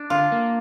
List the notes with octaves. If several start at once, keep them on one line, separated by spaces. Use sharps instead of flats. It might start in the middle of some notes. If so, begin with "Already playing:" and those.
Already playing: D4
D3 F4
A#3